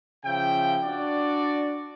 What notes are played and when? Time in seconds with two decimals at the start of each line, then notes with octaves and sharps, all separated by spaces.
0.25 C#3 F3 E5 G5
0.84 D4 F#4 D5